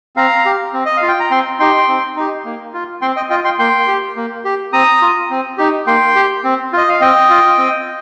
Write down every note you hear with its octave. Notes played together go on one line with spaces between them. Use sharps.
C4 F5 A#5
G4
C4
D#5
F5
F4
G5
A#5
C4 G5 C6
D#4 G4 G5 C6
C4
D#4 G4
A#3
F4
C4 G5 C6
D#5 G5
F4 D#5 G5
G5 C6
A#3 G5 C6
G4
A#3
G4
C4 A#5 D#6
F4
C4
D#4 G4
A#3 G5 C6
G4
C4
F4 D#5
F5
C4 D#5 G5
F4
C4